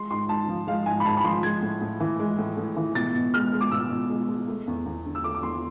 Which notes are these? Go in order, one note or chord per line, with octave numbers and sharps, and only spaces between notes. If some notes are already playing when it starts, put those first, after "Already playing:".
Already playing: G#3 C6
G#2 C6
G#2 A5
F3
G#3 F5
G#2 G#5
B5
G#2 A5
B5
F3 C6
G#3 G#6
A2
A2
E3
G#3
A2
A2
E3
B2 A6
B2
G#3 F6
G#3
D6
B2 E6
B2
G#3
G#3
A3
E2
E2
D3
E6
A3 D6
D6
E2 C6